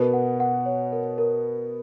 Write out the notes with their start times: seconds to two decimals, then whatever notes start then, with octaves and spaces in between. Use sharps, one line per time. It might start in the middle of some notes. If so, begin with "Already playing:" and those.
Already playing: B2 B3 A#4
0.13 F#5
0.40 F#5
0.66 C#5
0.92 A#4
1.18 A#4